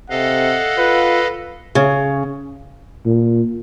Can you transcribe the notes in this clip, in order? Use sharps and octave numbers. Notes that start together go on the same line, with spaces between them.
C3 A4 D#5 F5 F#5
F4 B4
C#3
A#2